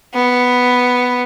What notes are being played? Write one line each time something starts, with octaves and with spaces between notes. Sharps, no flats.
B3